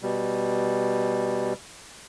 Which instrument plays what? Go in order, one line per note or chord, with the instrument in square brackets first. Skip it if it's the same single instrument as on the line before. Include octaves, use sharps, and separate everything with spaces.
[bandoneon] B2 G3